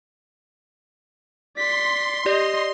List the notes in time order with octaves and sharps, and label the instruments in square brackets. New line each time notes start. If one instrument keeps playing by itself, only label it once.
[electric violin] D5 B6 [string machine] C6
[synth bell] G4 D5 [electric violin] D#5